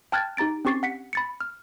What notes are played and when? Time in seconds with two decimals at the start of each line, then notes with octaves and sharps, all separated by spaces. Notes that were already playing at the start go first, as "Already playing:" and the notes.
0.12 G5 A5 F6 F#6 G#6 A6
0.37 D#4 G4 A#5 A6 D7
0.65 C4 C#4 G4 C#6 A6 C7
0.83 F#5 B6 C#7
1.13 B5 A6 C#7
1.41 F6